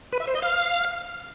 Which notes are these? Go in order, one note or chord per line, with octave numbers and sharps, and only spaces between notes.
B4
E5
C5
D#5
F5